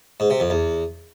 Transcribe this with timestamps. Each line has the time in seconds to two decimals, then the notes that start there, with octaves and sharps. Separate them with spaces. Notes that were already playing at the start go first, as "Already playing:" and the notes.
0.20 G#2
0.30 C3
0.40 F2
0.50 E2